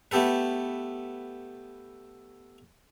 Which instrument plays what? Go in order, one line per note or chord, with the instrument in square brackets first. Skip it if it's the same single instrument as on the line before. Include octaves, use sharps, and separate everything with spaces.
[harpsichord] A3 B3 G4 A4 B4